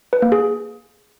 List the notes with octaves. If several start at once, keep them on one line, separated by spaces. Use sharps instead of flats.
B4
A#3
G#4